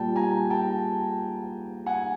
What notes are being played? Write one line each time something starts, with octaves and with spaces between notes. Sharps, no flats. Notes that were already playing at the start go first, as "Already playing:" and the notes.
Already playing: A#2 G3 G5 A5
G#5 A#5
G5 A5
F#5 G#5